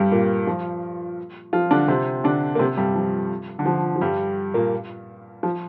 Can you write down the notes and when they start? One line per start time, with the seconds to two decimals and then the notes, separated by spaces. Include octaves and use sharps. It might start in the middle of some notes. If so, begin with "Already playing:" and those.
Already playing: G2 G3
0.12 A#2 A#3
0.47 F3 F4
1.53 F3 F4
1.71 D3 D4
1.88 C3 C4
2.24 D3 D4
2.55 A#3
2.59 C3 C4
2.77 G2 G3
2.95 F3
3.59 D3
3.66 F3
3.96 F3
4.01 G2 G3
4.54 A#2 A#3
5.43 F3 F4